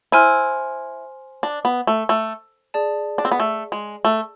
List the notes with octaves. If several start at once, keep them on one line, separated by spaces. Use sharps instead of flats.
E4 C5 G#5 C6 F6
D4
B3
A3
A3
G#4 D5 A5
D4
C4
B3
A3
G#3
A3